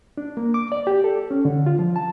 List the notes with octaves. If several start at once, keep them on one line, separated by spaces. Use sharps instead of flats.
D4
A#3
D6
D5
G4
A4
C#4
D3
F4
F3
A5